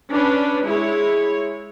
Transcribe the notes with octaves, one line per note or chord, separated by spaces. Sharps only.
C#4 D4 B4
G#3 E4 C#5